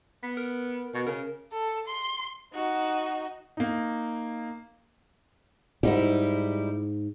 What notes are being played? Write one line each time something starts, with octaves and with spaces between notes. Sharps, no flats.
B3 B6
A#4
B2
C#3 A#4
A4
C6
D#4 F#4
A#3 D#4
G#2 G3 D#4 E4